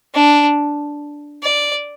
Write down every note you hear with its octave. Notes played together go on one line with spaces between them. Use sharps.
D4
D5